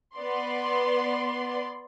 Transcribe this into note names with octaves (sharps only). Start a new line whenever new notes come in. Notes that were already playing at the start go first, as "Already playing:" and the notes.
B3 D5 C6